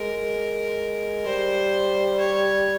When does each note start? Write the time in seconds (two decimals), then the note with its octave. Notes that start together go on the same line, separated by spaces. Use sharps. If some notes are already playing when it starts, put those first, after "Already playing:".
Already playing: G#3 A#4
1.25 G3 C5
2.20 C#5